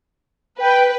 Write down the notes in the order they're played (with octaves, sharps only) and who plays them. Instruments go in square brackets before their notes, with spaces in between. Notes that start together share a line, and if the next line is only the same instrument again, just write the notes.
[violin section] B4 [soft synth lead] G5